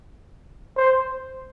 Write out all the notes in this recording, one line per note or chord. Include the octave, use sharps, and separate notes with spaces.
C5